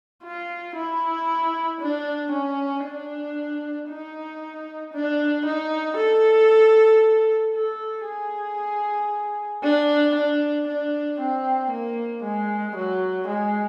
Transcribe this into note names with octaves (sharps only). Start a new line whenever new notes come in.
F4
E4
D4
C#4
D4
D#4
D4
D#4
A4
A4
G#4
D4
D4
D4
C4
A#3
G#3
F#3
G#3